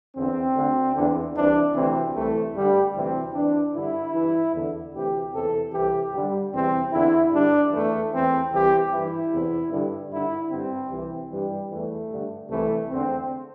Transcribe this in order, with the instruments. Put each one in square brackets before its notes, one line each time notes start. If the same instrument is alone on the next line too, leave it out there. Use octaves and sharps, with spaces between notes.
[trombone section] E2 D3 C4
D2 D3
E2 D3
C2 C3 E3 D4
D2 C3 E3 C4
C2 C3 E3 A3
G2 D3 G3
D2 C3 E3 C4
E2 E3 D4
G2 D3 E4
G2 E3
E2 D3
D2 C3 E3 G4
E2 C3 E3 A4
C2 C3 E3 G4
G2 D3 G3
E2 C3 E3 C4
E2 D3 E4
G2 D3 D4
E2 E3 A3
E2 E3 C4
C2 C3 E3 G4
G2 E3 E4
E2 C3 E3
G2 D3
G2 D3 E4
G2 D3 C4
C2 C3 E3
G2 E3 G3
E2 E3 A3
G2 D3
C2 C3 E3 A3
E2 D3 C4